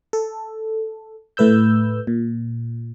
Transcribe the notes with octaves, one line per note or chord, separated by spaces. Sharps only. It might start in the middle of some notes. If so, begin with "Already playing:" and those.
A4
A2 A3 B4 E6 G6
A#2